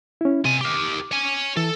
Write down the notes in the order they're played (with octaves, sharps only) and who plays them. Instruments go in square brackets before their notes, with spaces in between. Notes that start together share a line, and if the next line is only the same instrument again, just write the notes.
[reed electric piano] C#4 E4
[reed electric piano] C3 [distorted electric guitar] F4 G#5
[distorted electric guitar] G4 A#4 [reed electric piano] D6
[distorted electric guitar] C#5 G#5
[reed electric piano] E3 [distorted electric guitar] A4